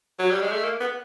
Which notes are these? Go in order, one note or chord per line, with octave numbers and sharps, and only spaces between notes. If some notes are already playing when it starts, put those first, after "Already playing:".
F#3
G3
G#3
A3
A#3
B3